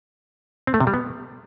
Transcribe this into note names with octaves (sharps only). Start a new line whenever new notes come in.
C4
A3
C3
G3
B3